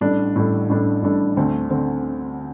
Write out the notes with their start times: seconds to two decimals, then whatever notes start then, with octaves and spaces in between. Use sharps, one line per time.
0.01 A1 A2 G3 D4 A4
0.36 A1 A2 G3 D4 A4
0.69 A1 A2 G3 D4 A4
1.02 A1 A2 G3 D4 A4
1.37 D2 D3 A3 C4
1.70 D3 A3 C4